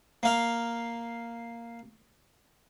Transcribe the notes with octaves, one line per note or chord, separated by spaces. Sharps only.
A#3 F5